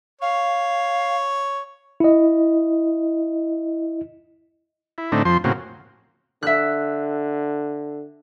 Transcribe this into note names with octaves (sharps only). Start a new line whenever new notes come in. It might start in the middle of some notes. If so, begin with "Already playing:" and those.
C#5 F5
E4 D#5
E4
A2 D3 A3 C4 D4 D#4
F2 F3 C5 C6
A2 C#3 A#3 C4 F#4
D3 E5 F#6